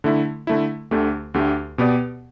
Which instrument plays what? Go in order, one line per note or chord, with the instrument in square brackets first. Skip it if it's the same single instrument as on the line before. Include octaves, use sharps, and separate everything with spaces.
[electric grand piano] D3 A3 E4
D3 A3 E4
D2 D3 A3 G4
D2 D3 A3 G4
B2 B3 G4 D5